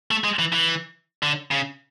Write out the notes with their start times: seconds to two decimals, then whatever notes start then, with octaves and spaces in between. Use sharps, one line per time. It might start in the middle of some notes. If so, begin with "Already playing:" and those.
0.11 A3
0.24 G#3
0.39 E3
0.53 E3
1.23 D3
1.51 C#3